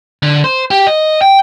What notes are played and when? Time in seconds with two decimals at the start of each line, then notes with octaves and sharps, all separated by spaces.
0.23 D3
0.44 C5
0.71 G4
0.87 D#5
1.22 G5